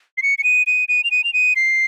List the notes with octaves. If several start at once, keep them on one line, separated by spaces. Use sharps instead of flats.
C7
C#7
C#7
D#7
D#7
D#7
F7
D#7
F7
D#7
C7